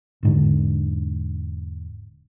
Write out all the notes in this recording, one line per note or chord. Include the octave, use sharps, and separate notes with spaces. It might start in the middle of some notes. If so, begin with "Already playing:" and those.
E1 G#2 D3